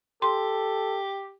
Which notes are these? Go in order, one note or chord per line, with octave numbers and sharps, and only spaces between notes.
G4 A4 C6